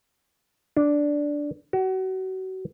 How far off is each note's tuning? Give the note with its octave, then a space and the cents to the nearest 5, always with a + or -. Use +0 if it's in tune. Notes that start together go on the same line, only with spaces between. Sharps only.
D4 -5
F#4 +30